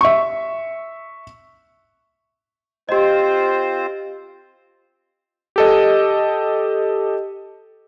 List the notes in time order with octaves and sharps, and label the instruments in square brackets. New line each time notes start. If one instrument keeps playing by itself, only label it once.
[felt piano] E5 C#6
[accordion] C4 F4 C5 [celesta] G4 D#5
[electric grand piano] G4 A4 D#5